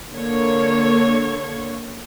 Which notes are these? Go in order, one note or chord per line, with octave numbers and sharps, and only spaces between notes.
D3 A#3 C#5